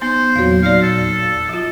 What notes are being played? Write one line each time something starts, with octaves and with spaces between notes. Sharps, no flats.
B3 D#4 C5 C6
E2 A#2 F#3 C#5 F5
D#4 D5 F5
A4
F3 F4